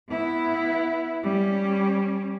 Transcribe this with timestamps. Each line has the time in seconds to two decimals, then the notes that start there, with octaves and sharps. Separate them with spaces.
0.10 B3 E4
1.24 G3 C#4